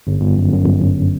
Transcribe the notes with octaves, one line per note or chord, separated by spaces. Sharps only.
G1
G1
F#2
F#2
G1
G1